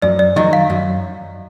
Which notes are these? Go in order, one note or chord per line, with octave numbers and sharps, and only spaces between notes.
F#2 D5
D5
D#3 F#3 D#5
F5
F#2